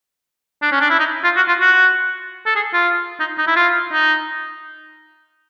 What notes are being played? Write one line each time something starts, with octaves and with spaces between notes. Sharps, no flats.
D4
C#4
D4
E4
D#4
F4
F#4
F4
F#4
A4
G#4
F4
D#4
D#4
E4
F4
D#4